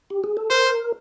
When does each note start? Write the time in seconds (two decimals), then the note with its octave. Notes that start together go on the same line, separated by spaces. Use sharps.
0.10 G4
0.24 G#4
0.37 A4
0.50 A#4 C5